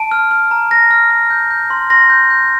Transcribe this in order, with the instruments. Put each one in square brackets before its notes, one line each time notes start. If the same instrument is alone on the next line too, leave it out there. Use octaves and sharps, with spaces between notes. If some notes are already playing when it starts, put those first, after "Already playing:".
Already playing: [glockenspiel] A5 D7
F6
F6
A#5
A#5 A#6
F6
F6
G6
G6
C6
C6 A#6
G6
G6